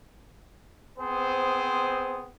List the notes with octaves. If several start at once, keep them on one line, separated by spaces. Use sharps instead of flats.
B3 C4 G#4 C5